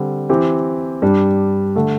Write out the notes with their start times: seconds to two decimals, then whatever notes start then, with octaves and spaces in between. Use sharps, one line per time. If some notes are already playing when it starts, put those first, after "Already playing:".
Already playing: D3 G3 C4
0.29 E3 C4 G4
1.02 G2 G3 D4
1.76 D3 A3